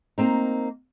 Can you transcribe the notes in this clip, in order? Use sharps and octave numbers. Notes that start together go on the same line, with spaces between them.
A#3 C4 D#4